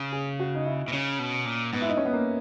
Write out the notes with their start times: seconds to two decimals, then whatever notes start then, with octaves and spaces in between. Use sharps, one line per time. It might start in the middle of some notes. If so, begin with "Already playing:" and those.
Already playing: C#3
0.12 G#4
0.40 F#4
0.55 D#4
0.66 E4
0.88 B2
0.93 C#3 C#4
1.19 B2
1.46 A#2
1.73 G#2 B3
1.82 E4
1.89 D#4
1.97 C#4
2.06 B3
2.13 A#3